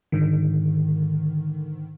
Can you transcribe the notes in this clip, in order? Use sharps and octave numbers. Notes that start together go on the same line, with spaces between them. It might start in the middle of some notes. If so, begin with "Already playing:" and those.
G#2 D3 D#3